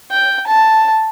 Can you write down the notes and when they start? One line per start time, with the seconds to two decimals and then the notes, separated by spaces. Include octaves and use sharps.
0.11 G5
0.47 A5